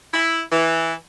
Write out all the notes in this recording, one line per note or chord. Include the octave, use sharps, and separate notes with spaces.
E4
E3